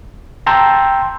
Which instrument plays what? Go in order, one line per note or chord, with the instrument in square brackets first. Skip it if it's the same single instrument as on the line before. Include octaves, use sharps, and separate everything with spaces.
[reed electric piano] G5 A5 A#5 C6 E6 G6